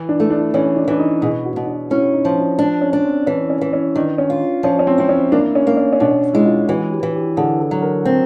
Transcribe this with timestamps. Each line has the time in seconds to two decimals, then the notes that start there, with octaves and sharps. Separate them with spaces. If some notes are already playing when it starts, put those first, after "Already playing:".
Already playing: E3
0.09 D4
0.20 A3
0.30 D4
0.54 E3 C#4
0.76 D4
0.88 E3 D4
0.99 D#4
1.22 B2 G#4
1.45 F#4
1.56 B2
1.67 D4
1.91 C#4 E4
2.13 D#4
2.25 F3
2.36 D4
2.59 D4
2.81 C#4
2.93 D4
3.05 C4
3.26 E3 C#4
3.50 C#4
3.61 E3
3.73 C#4
3.96 D#3 D4
4.18 C#4
4.30 F4
4.63 F3 C#4
4.79 C#4
4.87 C4
4.98 C4 E4
5.09 C#4
5.32 A#3 D4
5.55 C#4
5.67 A#3
5.77 C#4
5.93 C#4
6.00 B2 D4
6.33 G#3 E4
6.46 F4
6.68 E3 F#4
6.92 G4
7.03 E3
7.15 G4
7.36 D3 G#4
7.60 A4
7.71 F#3
7.82 A#4
8.05 C4